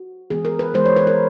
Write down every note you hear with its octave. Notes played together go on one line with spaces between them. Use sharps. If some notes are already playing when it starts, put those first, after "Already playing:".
Already playing: F#4
E3 G#3 B3 G#4
A#4
B4
E3 G#3 B3 C5
C#5
B4
A#4